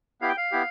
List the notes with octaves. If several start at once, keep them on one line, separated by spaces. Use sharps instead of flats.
B3 E4 G4 F5
G5
F5
B3 E4 G4